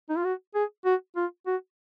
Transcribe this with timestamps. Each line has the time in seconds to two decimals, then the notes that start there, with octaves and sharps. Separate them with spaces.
0.10 D#4
0.16 F4
0.24 F#4
0.55 G#4
0.85 F#4
1.16 F4
1.47 F#4